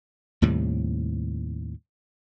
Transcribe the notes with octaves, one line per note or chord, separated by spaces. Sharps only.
D#2 A2 C3 G3